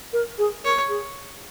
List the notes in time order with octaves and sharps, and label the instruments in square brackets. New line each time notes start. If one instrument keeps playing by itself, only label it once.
[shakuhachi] A#4
G#4
[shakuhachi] A#4 [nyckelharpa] C#5
[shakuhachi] G#4